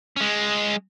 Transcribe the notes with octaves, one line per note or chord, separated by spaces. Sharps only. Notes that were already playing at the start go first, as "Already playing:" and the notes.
G#3 C#4